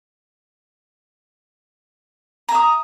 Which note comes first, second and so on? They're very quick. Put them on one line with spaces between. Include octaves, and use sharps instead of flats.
A#5 E5 D#6